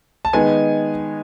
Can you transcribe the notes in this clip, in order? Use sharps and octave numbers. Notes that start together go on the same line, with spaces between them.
A5
D#3 G#3 B3 D#4 G#5